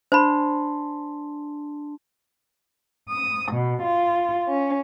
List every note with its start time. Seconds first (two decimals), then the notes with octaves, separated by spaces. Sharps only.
0.12 D4 C5 A5 B5 C6
3.09 D#6
3.53 B2
3.83 F4
4.48 C#4